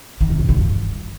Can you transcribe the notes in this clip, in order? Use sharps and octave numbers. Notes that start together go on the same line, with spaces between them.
D#3
C3
F#2
D#3
G2